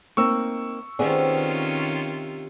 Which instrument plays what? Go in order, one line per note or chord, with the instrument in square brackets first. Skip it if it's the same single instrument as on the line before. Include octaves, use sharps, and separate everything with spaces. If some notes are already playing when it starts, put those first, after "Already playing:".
[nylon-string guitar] A#3 C4 D#4 [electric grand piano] C#6 E6
[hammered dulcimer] C3 [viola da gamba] D#3 C#4 F4 [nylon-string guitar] B3 G#4 D5